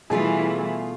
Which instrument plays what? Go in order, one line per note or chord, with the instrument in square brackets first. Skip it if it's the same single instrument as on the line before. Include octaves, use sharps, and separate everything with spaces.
[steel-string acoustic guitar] B2 A3 F4 [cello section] E3 G3 E4 [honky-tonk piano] G#4